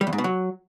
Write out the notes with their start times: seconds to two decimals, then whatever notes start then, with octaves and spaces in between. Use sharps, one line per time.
0.01 G3
0.07 E2
0.13 G#2
0.18 B2
0.24 F#3